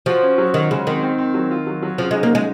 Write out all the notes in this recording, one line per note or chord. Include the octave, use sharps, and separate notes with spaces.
F3 F#4
C#4
F#3
D#3 F#4
C#3 G#3
D#3 C4
C4
C4
F#3
F4
F#3
F#3
C#3 F3
G#3 D#4
A#3
C#3 G#3